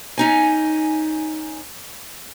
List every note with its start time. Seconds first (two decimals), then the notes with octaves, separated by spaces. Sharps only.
0.18 C#4 D#4 G#5